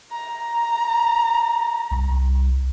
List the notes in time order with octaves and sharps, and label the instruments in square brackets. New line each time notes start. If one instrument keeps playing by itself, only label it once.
[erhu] A#5
[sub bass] C2